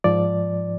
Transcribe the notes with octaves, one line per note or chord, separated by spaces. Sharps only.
G#2 F3 D5